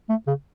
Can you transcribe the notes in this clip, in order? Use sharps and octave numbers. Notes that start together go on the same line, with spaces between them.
A3
C#3